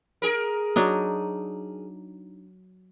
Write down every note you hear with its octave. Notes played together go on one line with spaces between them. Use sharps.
G#4 A#4
F#3 D4 D#4